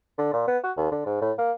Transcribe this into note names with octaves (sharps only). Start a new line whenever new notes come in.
D3
A#2
B3
F#4
D#2
D3
G#2
A2
A#3